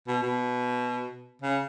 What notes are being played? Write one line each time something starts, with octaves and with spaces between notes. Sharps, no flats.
B2
B2
C#3